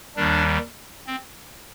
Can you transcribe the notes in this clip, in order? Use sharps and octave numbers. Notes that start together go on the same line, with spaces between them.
D#2 D#3 G3 D4
C4